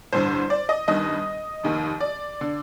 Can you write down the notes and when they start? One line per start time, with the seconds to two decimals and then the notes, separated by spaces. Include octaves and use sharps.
0.13 A1 G2 D3 C5
0.50 D5
0.69 D#5
0.88 G1 G2 D#3 D#5
1.63 F1 D#2 D#3
2.01 D5
2.41 D3